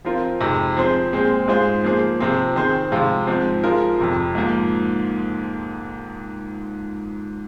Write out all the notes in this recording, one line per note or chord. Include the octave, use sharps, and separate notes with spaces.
F3 C4 F4 A#4
F2 C3 G#3 D#4
F3 C4 G#4 C5
A#2 G#3 C4 G#4 C5
G#2 G#3 F4 G#4 C5
F3 A#3 G#4 C5
C3 F3 C4 G#4
D#3 C4 G#4 C5
C3 F3 G#3 F4
G#2 F3 C4
F3 G#3 F4 A#4
F2 C3 F3
G#2 F3 A#3